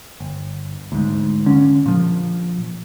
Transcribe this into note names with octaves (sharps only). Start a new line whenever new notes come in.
G1
D2 G#2
D3 C#4
A#2 F3